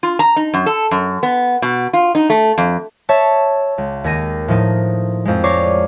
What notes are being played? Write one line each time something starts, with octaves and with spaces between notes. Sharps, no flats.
F4
A#5
D#4
F#2
A4
F#2
B3
B2
F4
D#4
A3
F2
C#5 E5 A5
C#2
D#2 G#6 A#6 D#7
A2 F3 D#4
F2 G#3
C#5 D5 A#5 C#6 D6 C7